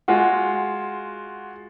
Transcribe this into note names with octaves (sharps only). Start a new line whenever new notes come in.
G#3 F4 F#4